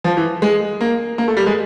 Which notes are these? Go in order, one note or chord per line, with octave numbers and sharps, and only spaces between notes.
F3
E3
G#3
A#3
A#3
A3
G3
G#3